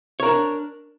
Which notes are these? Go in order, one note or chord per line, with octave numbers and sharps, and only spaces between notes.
D4 A#4 C#5